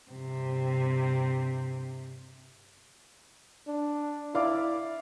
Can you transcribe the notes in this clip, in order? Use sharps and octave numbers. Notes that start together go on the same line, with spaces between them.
G2 C3
D4
E4 D5 F5 D6